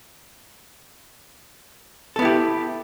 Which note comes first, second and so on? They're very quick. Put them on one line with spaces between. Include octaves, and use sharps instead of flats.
A4 B3 E4 G4